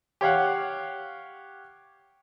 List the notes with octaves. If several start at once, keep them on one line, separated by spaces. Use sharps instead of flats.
G4 C#5 F5 F#5